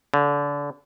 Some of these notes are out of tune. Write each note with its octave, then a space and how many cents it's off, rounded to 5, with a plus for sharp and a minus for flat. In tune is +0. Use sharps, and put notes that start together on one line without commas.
D3 -30